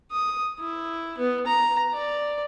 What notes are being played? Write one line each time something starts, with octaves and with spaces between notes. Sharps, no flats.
D#6
E4
B3
A#5
D5